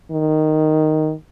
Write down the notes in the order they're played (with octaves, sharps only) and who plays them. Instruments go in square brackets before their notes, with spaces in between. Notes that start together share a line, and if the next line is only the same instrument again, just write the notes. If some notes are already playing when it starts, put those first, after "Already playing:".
[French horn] D#3